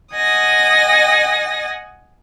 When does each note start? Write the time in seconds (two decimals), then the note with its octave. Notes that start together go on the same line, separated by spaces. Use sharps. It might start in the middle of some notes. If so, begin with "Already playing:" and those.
0.15 D#5 F#5 G#5 D#6 A#6